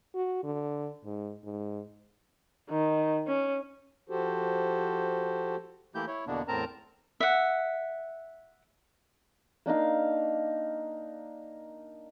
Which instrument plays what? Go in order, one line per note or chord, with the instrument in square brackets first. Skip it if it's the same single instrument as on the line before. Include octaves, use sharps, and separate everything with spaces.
[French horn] F#4
D3
G#2
G#2
[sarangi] D#3
C#4
[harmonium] F3 F#4 G4 A4 C5
[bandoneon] E3 A3 A#3 E4 G4 G6
E4 C#5
E2 B2 D3 A#3 B3 D4
E2 A2 C4 A#4 A5 A#5
[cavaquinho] E5 F#5
[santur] A#3 D4 D#4 F5